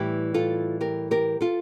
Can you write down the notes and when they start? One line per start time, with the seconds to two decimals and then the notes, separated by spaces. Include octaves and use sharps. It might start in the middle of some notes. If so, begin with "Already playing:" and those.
Already playing: A2 E3 G3 E4 G4
0.34 F4 A4
0.81 G4 A#4
1.11 G4 A#4
1.41 F4 A4